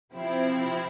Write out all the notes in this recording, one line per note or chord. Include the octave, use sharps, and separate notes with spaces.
C3 F3 C4 E4